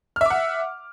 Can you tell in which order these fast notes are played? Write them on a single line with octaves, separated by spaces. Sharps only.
F6 E5 D6 F#5